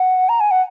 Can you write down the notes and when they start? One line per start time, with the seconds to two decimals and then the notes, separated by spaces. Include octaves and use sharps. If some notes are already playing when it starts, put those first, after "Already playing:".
Already playing: F#5
0.29 A#5
0.40 G#5
0.51 F#5